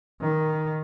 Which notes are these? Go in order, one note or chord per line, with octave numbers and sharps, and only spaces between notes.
D#3